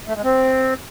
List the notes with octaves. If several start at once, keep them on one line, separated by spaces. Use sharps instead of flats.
A3
G#3
C4